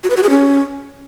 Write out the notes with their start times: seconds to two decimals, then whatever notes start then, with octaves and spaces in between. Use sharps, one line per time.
0.04 F#4
0.10 B4
0.17 F#4
0.23 G#4
0.30 C#4